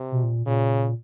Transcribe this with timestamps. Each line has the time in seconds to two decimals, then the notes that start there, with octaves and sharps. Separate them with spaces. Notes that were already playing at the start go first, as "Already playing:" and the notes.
Already playing: C3
0.12 B2
0.24 A#2
0.46 A#2 C#3